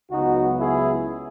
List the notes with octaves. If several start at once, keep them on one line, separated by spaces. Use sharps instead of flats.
C#2 C#3 F#3 B3 D#4 F#4
E4 G#4